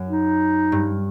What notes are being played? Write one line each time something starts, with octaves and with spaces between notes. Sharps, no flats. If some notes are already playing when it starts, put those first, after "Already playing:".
Already playing: F#2
D#4
G2